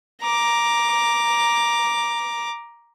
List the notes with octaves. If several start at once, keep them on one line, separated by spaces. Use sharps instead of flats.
A#5 D6